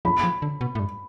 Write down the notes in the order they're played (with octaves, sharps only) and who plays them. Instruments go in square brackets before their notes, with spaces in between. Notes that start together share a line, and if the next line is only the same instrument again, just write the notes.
[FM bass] F3 [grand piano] B5
[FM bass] F3
D3
B2
A2
G2